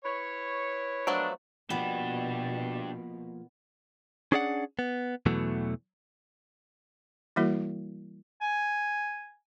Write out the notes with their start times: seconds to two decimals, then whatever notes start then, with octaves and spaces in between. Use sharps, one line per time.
0.04 E4 B4 C#5
1.07 F3 F#3 A3 B3 D4
1.70 B2 F3 A#3 B3 D4 G4
4.32 C#4 D4 G#4 D5 F5 F#5
4.79 B3
5.26 E2 B2 E3 F#3 A3
7.36 E3 G3 A#3 E4 F#4 A#4
8.41 G#5